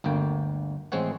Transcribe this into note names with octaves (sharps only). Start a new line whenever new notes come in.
G1 D2 A#3 G5
A1 G#3 C4 C5 C#5 F#5